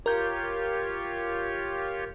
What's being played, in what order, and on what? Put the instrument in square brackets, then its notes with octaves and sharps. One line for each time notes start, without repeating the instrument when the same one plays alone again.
[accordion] F4 G4 C#5 [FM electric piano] A#4 G6